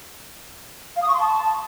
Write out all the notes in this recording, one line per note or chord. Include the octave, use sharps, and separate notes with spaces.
F5
D#6
C#6
C6
A5